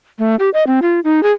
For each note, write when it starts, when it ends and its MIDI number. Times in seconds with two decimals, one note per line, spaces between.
0.19 0.36 57
0.39 0.50 67
0.54 0.66 75
0.67 0.80 60
0.82 1.00 65
1.04 1.23 63
1.23 1.31 68